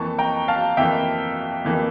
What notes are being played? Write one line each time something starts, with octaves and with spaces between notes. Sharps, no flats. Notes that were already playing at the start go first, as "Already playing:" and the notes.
Already playing: F2 E3 A#3 A5 C#6
G5 A#5
F5 A5
F2 E3 A#3 E5 G5
F2 E3 A#3